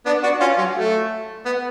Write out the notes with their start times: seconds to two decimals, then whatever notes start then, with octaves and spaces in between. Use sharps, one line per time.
0.06 B3 D4
0.23 D4 F#4
0.40 C#4 F4
0.58 F#3
0.76 A3
1.45 B3